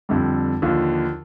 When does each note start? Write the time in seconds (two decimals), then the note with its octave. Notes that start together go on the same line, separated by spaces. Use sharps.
0.09 F2 D3 G3
0.62 D#2 D3 F3